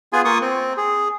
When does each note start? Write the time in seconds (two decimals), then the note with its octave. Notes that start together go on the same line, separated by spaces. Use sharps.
0.13 B3 F4 G#4 G#5
0.25 A#3 F4 C#6 D#6
0.42 C4
0.77 G#4